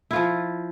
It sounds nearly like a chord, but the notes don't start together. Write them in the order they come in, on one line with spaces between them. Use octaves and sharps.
E4 F4 F3